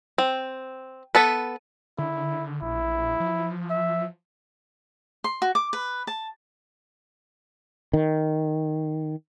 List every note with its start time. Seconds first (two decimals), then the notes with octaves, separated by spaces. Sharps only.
0.18 C4
1.15 B3 A4 B4
1.98 D3 E4
2.62 A#1 E4
3.20 F3
3.70 E5
5.24 C6
5.42 F#4
5.55 D6
5.73 B4
6.07 A5
7.93 D#3